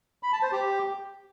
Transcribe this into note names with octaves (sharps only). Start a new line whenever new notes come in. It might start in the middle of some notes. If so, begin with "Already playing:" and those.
B5
A5
C5
G4